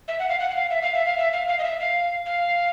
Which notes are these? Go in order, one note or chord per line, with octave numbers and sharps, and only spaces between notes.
E5
F#5
F5
F#5
F#5
F5
E5
F5
E5
F5
E5
F5
F5
D#5
E5
F5
F5